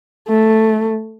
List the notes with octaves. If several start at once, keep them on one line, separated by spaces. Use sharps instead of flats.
A3